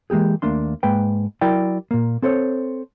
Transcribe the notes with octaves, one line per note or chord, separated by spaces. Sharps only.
E3 G#3 A#3 G4 G#4
D#2 A3 A#3 D4 C6
G#2 G#3 A#3 B4 G5
F#3 E4 A#4 D5 G5
A#2 A#3
C4 A4 C5 C#5